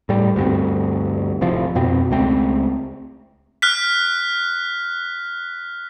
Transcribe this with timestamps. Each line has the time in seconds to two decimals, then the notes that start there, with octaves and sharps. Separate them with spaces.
0.09 A2 G3
0.36 D2 G2 C4
1.41 D1 A2 C3 F3
1.75 F2 B2 C4
2.11 C#2 A3 C4
3.62 F6 F#6 B6